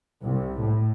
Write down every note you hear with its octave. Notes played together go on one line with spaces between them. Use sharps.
C2
A2